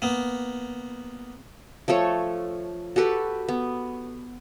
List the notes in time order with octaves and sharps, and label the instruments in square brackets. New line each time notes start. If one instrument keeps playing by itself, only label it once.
[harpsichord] A#3 B3
[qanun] F3 A3 A4 C#5
F#4 G4 A4 B4
B3